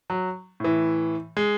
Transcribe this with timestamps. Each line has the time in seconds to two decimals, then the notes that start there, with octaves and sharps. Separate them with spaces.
0.10 F#3
0.60 A2 E3
1.37 G#3